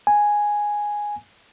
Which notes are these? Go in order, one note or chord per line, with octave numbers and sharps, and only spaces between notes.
G#5